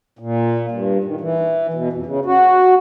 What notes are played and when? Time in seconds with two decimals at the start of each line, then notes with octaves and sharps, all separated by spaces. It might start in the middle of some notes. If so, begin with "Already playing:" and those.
0.19 A#2
0.71 G2
1.04 D#3
1.21 E3
1.74 B2
1.93 F2
2.06 C#3
2.25 F#4